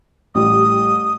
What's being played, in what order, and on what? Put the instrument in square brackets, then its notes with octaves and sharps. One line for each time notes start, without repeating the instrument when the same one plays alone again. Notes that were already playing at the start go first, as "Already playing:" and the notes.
[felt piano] A1 G3 [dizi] D#6